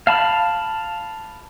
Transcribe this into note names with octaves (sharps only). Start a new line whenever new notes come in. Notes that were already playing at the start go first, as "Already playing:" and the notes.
F5 A5 B5